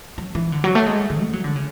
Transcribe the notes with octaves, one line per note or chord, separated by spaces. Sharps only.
F#3
E3
D3
F#3
A3
G#3
D3
A3
F#3
D3
C#3